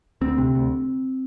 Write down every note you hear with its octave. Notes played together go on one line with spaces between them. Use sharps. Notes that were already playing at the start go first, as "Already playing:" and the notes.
D2 C4
C3
D2